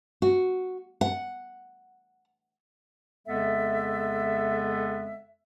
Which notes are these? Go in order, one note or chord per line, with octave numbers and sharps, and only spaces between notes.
F#4
F#5
F2 C#3 G#3 B3 A4 E5